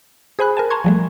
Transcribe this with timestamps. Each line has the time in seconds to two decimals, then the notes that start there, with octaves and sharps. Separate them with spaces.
0.39 G#4 C5 G#5 B5 F#6
0.57 A#4 G#5 A5
0.70 A5 A#5 C6 C#6 G#6
0.84 F3 G3 A3